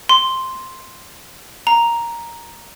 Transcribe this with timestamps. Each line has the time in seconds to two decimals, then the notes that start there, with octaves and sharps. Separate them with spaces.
0.09 C6
1.67 A#5